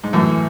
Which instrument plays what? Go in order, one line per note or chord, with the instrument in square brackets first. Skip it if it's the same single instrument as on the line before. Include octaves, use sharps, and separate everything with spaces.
[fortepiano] G#2
[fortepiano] F#2 A2 [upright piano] E3